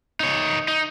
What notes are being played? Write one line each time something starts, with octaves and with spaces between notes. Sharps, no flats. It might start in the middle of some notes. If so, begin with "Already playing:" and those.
D#4 C#5
D#4